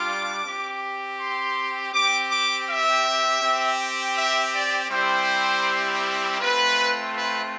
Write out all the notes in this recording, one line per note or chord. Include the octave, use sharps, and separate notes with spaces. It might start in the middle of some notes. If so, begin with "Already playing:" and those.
Already playing: G3 D4 F4 D6
C4 G4
C6
C4 G4 D6
D6
E5
C4 G4
E5
D5
G3 C4 E4 G4 C5
A3 C4 F4 B4
B4